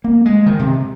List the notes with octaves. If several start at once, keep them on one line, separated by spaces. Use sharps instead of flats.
A#3
G#3
D#3
C3